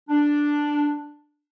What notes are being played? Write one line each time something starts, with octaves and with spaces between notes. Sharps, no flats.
D4